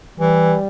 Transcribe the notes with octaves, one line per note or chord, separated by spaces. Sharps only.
E3 G3